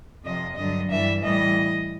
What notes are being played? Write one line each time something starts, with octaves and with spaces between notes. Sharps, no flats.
F2 C3 F3 D#5
G2 D3 F#3 D#5
G2 E3 G3 E5
A2 E3 G3 D#5